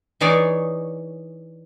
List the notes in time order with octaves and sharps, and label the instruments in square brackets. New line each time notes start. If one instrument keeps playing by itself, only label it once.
[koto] E3 D#4 G#4 C#5 D5